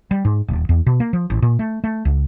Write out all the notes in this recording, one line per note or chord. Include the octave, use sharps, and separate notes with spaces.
G3
G#2
D#1
E2
B2
A#3
F3
A1
A#2
A3
A3
C#2